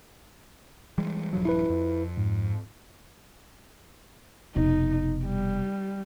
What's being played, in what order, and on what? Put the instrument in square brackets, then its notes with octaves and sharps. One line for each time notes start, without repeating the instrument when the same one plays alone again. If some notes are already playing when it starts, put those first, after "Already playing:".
[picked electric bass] E3 G3 G#3
[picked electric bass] D#1 G2 F3 [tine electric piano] F#3
[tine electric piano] E4 B4
[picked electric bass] F2
[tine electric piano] G#2
[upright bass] F1 B2 [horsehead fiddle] D#4
[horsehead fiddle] G3